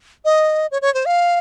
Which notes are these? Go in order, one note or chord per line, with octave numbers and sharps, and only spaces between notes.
D#5
C#5
C#5
C5
F5